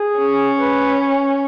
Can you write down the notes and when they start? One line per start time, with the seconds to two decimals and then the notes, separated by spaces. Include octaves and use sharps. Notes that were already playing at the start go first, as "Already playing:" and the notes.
Already playing: G#4
0.19 C#4
0.59 B4